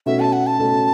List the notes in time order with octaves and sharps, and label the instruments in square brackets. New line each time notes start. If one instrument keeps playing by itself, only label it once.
[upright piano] B2 A3 C#4 [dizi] E5
[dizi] A5
F#5
A5
[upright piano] B2 A3 C#4